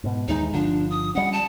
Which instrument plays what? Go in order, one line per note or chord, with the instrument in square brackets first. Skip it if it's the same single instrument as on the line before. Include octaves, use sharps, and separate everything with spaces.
[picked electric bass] G#2 B2
[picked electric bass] D#2 E3 G#3 [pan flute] D#4
[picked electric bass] G1 D3 F3 [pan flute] D4
[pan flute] D#6
[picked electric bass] G3 C#4 [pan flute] F#5
[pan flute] A5